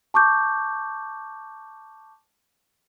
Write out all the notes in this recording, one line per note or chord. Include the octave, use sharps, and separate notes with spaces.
A5 C#6 D6 G6